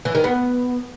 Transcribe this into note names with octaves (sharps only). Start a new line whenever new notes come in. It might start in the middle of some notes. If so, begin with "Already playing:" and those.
E3
D#3
B3